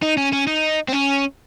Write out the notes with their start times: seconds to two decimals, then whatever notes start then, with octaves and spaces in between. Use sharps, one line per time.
0.02 D#4
0.17 C#4
0.33 C#4
0.47 D#4
0.88 C4
0.92 C#4